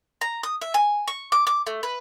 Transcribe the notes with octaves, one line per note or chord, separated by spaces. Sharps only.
A#5
D#6
E5
G#5
C#6
D6
D6
A3
B4